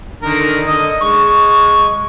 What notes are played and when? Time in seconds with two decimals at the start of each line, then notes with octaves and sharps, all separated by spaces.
0.22 D3 D#3 A#4
0.66 D3 D#5
1.01 G#3 C#6